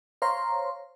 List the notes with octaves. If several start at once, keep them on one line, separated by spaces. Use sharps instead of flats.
C5 C#5 F5 A#5 C6